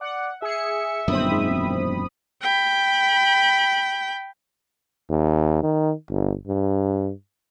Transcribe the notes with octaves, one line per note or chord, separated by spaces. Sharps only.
D5 F#5
G#4 E5 C#7
G1 F#2 A#2 D#3 C4 B5 D#6
G#2
E1
G5 B5
D#2
D#3
G1
G2